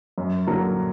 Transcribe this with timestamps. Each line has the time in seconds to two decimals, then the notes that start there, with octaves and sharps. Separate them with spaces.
0.18 F#2
0.47 D3 F#3 A#3